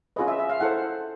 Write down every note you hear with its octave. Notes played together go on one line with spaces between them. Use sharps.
C#4 F4 G#4 B4 D#5
E5
E5
F5
E4 A4 C5 F#5